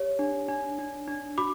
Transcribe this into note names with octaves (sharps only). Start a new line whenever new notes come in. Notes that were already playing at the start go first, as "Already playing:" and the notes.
Already playing: G4 C#5
D4
D4
D4
D4
F#4 B5 D6